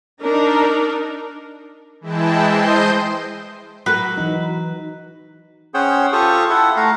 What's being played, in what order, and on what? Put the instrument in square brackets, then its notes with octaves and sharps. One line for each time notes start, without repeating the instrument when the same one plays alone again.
[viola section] D4 D#4 A#4
[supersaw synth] E3 G#3 E4 G5 A5
C5 D#5 C6 G6
[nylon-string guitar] F#3 F#4 A#4 [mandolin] B4
[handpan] E3 D#4
[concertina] C#4 G#4 C5 C#5 F#5 G5
F4 G4 A4 C5 C#6 D#6
E4 A4 E5 F#5
A3 F5 F#5 A#5